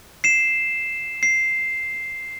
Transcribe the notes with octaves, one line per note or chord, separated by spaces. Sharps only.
C7 E7
C7